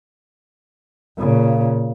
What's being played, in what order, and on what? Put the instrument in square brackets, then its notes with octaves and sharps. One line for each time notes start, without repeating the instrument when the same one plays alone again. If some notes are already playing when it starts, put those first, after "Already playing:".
[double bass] A#2 C#3